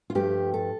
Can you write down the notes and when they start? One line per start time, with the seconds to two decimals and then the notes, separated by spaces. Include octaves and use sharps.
0.10 F4
0.15 G2 F3 A3 G4
0.54 A4